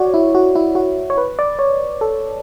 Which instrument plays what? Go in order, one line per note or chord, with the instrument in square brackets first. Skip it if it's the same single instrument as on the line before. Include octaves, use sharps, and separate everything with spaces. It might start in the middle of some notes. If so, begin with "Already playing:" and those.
Already playing: [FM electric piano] F#4 C#5 D5
E4
F#4
E4
F#4
C#5
B4
D5
C#5
A4